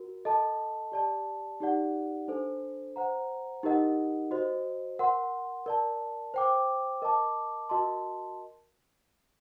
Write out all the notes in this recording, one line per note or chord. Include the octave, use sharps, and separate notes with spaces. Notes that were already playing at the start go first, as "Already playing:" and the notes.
Already playing: F#4 A#4
A4 D#5 A5
G4 D5 A5
D#4 G4 D5 F#5
D4 A4 C5
C5 F#5 A#5
D#4 G4 A#4 D#5 F#5
F#4 C5 D#5
A#4 F#5 C6
A#4 D5 A5
C5 G5 D6
A#4 D#5 A5 D6
F#4 A#4 D#5 A5 C6